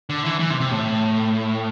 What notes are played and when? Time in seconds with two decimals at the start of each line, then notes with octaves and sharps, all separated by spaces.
0.09 D3
0.25 E3
0.40 E3
0.50 C3
0.60 C3
0.71 A2